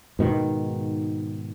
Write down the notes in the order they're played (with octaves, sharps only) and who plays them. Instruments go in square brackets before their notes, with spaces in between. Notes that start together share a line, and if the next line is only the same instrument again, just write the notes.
[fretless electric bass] G#2 B2 D#3